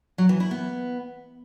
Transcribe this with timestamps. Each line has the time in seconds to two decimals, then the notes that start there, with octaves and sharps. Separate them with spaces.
0.18 F#3
0.29 E3
0.40 E4
0.51 B3